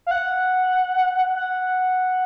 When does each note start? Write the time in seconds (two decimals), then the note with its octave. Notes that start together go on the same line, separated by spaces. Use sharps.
0.06 F5
0.11 F#5
1.35 F#5